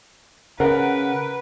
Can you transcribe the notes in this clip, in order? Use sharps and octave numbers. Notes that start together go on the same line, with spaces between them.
C#3 A#4 B4 F#5